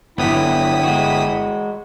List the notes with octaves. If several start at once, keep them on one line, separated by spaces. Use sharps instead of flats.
G1 D3 F#3 B3 E4 G5 D#6 B6
G#3 F#4